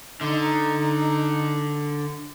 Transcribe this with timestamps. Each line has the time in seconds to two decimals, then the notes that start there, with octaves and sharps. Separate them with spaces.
0.21 D3 D#4